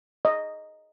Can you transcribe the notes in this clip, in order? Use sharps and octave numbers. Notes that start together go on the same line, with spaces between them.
D#5